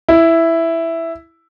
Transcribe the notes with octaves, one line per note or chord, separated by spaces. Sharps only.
E4